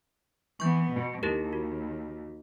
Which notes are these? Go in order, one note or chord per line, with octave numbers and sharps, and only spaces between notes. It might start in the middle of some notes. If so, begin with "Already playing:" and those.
E3 B3 C#6 G6
B2
D#2 E4 G4 A#4
F#4